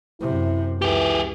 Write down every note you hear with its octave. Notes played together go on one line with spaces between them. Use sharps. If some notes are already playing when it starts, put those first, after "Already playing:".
F#2 C3 E4
C#2 E3 G4 G#4